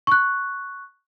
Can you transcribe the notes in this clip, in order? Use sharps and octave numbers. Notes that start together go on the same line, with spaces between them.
C#6 F#6